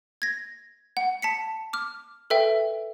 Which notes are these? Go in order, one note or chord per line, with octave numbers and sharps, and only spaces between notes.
G#6 A#6
F#5
A5 B6 C#7
D6 F6
A4 B4 E5 G5